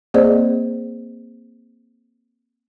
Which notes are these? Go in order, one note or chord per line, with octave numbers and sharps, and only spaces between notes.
A#3 C4 G#4 C5 D5 D#5